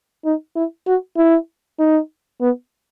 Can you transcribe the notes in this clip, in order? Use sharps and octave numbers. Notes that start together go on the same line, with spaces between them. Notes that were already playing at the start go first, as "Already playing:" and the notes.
D#4
E4
F#4
E4
D#4
B3